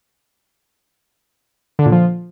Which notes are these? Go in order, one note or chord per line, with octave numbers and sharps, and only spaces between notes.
D3
A#2
F3